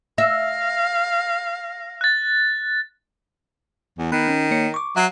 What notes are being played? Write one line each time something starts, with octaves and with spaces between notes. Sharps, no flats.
E5 F5 A#6
F#6 A6
E2
D#3 B3 B5 F#6
C#4
A#3 C#5 C#7
C#6 D6
F#3 E5 C7